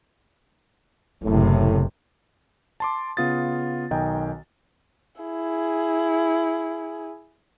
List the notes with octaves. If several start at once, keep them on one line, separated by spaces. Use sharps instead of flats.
F#1 A2 C3
A5 C6 D6
C#3 B3 F4 D#6 A6
B1 D#3 D#5 G5 G#5 A#5
E4 G#4